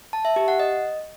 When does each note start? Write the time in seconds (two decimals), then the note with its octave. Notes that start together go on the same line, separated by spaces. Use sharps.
0.13 A5
0.25 E5
0.36 G4
0.48 F#5
0.60 D#5